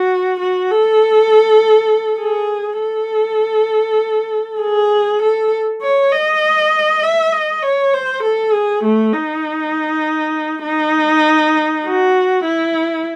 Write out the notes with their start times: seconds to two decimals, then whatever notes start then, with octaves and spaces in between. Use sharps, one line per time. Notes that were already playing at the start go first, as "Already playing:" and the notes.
Already playing: F#4
0.40 F#4
0.71 A4
2.20 G#4
2.81 A4
4.61 G#4
5.22 A4
5.82 C#5
6.12 D#5
7.03 E5
7.32 D#5
7.63 C#5
7.93 C5
8.23 A4
8.53 G#4
8.84 A3
9.13 D#4
10.64 D#4
11.85 F#4
12.44 E4